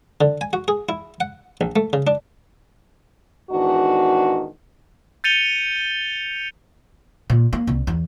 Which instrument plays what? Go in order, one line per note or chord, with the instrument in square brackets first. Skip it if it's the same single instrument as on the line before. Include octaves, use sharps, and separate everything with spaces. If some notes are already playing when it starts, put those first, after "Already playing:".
[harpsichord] D3
G#5
F#4
G#4
E4
F#5
A#1
A3
C#3
D4
[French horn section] E2 G#2 D#3 D4 F#4
[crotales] G6 A6 C#7 D#7 F7 G7
[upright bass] A#2
A#3
C2
E2